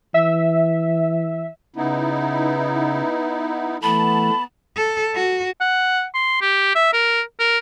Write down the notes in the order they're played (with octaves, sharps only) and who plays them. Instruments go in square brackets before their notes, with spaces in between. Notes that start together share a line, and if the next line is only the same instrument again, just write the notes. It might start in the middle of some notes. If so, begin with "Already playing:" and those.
[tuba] E3 [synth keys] E5
[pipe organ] C#3 [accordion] B3 D#4 E4
[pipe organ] E3 A3 [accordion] B3 A5 [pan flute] B5
[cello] A4
F#4
[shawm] F#5
C6
G4
E5
A#4
A#4